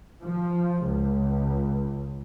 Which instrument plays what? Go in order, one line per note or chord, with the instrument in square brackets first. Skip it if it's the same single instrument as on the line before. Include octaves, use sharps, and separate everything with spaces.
[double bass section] F3
C#2